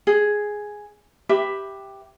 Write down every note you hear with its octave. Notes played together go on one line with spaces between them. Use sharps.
G#4
G4 B4 E5